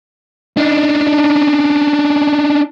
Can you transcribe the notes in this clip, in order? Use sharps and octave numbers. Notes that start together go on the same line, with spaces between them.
D4 D#4